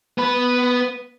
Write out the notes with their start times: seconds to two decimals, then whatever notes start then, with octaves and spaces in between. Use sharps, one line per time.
0.18 B3 B5